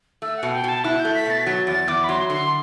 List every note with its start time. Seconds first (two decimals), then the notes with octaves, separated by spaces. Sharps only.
0.22 A3 E6
0.37 F#5
0.43 B2
0.52 G5
0.64 B2 A5
0.84 E4 F#6
0.99 G6
1.05 A3
1.15 B6
1.26 B2 A6
1.39 B6
1.46 F#3 A6
1.67 E2 A6
1.88 E2 D6
2.04 B5
2.09 F#3 C6
2.29 D3 C6